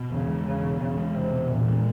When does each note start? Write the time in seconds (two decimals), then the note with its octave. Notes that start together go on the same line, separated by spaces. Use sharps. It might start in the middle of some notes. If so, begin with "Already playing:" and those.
Already playing: B2
0.11 E2 C#3
0.28 G#3
0.46 E2 C#3
0.63 B2
0.80 E2 C#3
0.97 G#3
1.15 E2 C3
1.32 B2
1.49 E2 A#2
1.67 G#3